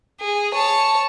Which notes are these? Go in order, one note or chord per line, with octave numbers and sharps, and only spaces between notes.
G#4
C#5 A5